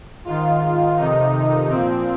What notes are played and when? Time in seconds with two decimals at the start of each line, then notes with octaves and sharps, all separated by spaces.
0.25 G#2 D#3 F4
0.97 F2 C3 D#3 D#4
1.69 A#2 F3 C4